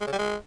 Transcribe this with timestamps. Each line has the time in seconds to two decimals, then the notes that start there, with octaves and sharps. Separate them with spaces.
0.01 G#3
0.07 C#3
0.13 G3
0.18 G#3